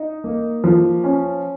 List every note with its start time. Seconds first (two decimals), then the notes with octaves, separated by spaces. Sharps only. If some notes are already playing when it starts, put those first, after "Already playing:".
Already playing: D#4
0.24 A#3
0.64 F3
1.04 C#4